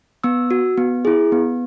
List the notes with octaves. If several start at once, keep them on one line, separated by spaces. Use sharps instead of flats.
B3 E6
F#4
B3
E4 G#4
B3